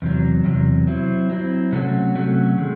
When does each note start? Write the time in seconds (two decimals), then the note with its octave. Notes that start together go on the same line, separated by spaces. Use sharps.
0.02 E2 C3 F#3
0.44 E2 C3 F#3
0.87 F#3 C4 E4
1.30 F#3 C4 E4
1.72 C3 F#3 A3 C#4 F#4
2.15 C3 F#3 A3 C#4 F#4
2.58 D#3 G#3